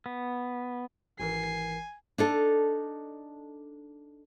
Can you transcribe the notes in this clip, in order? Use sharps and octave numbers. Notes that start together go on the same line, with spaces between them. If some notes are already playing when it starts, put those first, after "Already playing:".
B3
G#1 E3 A#4 G#5 C7
D4 D#4 A4